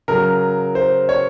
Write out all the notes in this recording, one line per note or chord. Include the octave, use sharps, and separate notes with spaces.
C#3 F#3 A#4
C5
C#5